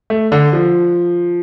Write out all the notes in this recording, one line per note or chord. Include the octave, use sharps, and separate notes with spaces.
A3
D3
F3